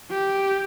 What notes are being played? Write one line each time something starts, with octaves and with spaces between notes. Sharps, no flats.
G4